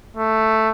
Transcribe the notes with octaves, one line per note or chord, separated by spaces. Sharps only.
A3